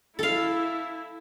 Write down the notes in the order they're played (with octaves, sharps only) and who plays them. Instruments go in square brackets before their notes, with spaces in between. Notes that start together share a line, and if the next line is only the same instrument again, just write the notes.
[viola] E4 [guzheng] A4 F5